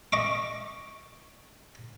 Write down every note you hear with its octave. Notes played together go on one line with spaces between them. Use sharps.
D#5 C#6 D6